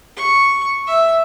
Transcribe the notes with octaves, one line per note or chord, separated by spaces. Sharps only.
C#6
E5